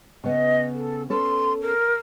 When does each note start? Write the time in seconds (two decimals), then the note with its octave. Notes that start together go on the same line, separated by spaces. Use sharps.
0.24 C#3 B3 D#5
0.72 A4
1.10 C#4 A4 B4 C6
1.61 A#4